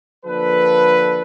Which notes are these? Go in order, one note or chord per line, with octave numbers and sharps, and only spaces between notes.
D3 F3 A#3 D4 A4 B4